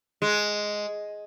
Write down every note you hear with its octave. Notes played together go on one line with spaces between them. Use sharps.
G#3